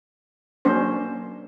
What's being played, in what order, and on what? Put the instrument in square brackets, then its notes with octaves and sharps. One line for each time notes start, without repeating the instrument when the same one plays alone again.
[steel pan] F#3 A#3 C#4 D4 C5